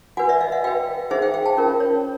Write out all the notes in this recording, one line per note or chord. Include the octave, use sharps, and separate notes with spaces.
F#4 B4 F#5 G#5
D5 E5
D#5 F5
E5 F#5
F#4 B4 F5 G5
D#4 G#4 C5 E5 F#5
F5 G5
F5 G5
G5 A5
C#4 F4 A#4
C#5